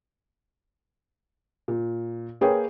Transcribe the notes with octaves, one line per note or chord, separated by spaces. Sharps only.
A#2
A#3 G#4 B4 C#5 G5